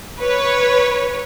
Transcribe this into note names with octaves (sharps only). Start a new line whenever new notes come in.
B4 C#5